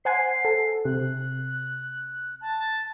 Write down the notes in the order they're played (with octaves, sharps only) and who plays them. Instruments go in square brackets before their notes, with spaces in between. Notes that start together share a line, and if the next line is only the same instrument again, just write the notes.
[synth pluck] C5 F#5 G#5 [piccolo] C7
[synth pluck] A4
[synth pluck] C3 [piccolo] F#6
[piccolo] A5